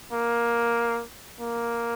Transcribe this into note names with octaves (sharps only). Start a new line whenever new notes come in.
A#3
A#3